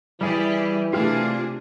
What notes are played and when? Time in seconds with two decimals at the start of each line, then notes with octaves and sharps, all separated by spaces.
0.21 E3 G3 E4 G4 G#4 D5
0.93 C3 A3 D4 F4 G4 G#4 F6